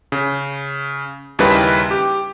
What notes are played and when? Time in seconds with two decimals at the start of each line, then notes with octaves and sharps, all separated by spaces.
0.12 C#3
1.39 D#2 C#3 G3 D#4 E4 B4
1.91 G4